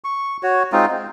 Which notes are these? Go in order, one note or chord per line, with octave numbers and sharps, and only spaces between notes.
C#6
F#4 C#5
G#3 C4 D#4 F4
C4